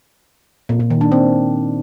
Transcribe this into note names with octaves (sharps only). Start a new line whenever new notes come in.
A#2
A#2
D#3
D4
C4